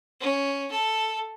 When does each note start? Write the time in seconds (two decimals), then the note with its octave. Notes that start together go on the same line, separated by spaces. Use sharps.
0.20 C#4
0.72 A4